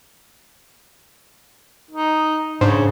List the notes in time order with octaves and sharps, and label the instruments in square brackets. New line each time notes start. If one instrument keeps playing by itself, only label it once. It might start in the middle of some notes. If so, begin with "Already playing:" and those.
[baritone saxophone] D#4
[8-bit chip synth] G#2 [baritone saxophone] C#3 [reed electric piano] D4 C5